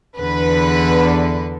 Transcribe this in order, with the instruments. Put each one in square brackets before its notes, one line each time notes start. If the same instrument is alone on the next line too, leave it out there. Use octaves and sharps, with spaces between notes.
[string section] E2 D3 B4